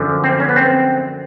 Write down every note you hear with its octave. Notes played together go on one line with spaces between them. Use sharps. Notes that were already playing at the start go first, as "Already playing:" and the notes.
Already playing: F#2 D3 F3
C4
C#4
B3
C4